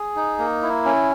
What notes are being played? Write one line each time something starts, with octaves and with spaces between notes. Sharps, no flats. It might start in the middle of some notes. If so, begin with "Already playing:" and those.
Already playing: G#4
D#4
A#3
E4
C#4